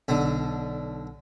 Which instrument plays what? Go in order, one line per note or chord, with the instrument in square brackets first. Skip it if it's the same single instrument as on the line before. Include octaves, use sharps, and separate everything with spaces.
[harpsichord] B1 D3